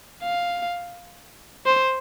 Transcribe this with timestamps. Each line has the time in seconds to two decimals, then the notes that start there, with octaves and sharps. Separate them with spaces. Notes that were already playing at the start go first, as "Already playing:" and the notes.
0.23 F5
1.66 C5